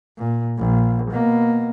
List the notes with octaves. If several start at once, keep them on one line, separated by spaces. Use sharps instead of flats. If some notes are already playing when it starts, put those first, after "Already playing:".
A#2
A#1
B2 A#3